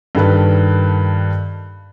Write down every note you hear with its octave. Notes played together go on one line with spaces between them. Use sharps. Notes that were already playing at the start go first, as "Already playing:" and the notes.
G2 D#3 A4 B4